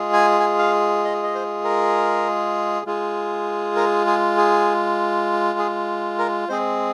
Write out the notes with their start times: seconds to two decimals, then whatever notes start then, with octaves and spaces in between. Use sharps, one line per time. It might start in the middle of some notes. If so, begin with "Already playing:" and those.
Already playing: G#3 F4 G#4
0.13 G#5
0.40 G#5
0.59 F5
1.04 D#5
1.23 D#5
1.35 C5
1.64 A#4
2.86 G#3 F4 G#4
3.76 A#4
4.07 G#4
4.37 G#4
5.58 G#4
6.18 A#4
6.49 G#3 C4 G#4 C5